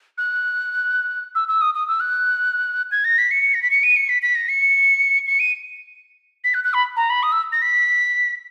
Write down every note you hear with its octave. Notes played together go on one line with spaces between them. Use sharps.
F#6
E6
E6
D#6
D#6
E6
F#6
G#6
A#6
B6
C#7
A#6
B6
C#7
D#7
C#7
B6
B6
A#6
C#7
C#7
D#7
B6
F#6
F#6
B5
A#5
B5
D#6
E6
A#6
B6